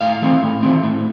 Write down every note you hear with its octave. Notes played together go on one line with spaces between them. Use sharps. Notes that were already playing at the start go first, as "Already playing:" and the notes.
A2 F5
E3 A3 C4
A2
E3 A3 C4
A2